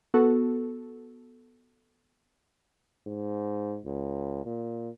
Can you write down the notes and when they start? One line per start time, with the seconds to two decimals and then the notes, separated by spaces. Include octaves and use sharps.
0.14 B3 F#4 A4
3.07 G#2
3.86 C#2
4.45 A#2